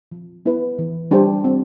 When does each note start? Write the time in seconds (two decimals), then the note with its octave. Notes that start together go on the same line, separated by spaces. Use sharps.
0.12 F3
0.45 B3 E4 B4
0.79 E3
1.11 G3 D4 G4 C5
1.44 C4